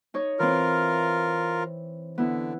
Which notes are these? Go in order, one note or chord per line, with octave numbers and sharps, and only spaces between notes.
D#4 C#5
E3 C4 F4 A#4
D3 B3 E4